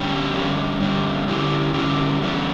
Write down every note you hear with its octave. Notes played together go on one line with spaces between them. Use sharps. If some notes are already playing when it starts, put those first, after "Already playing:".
Already playing: D3 G3 C#4 G4
G2 D3 G3 C#4
G2 D3 G3 C#4
D3 G3 C#4 E4 G4
D3 G3 C#4 E4 G4
E2 D3 G3 C#4